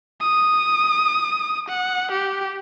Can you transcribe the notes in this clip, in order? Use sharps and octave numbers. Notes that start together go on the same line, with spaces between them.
D#6
F#5
G4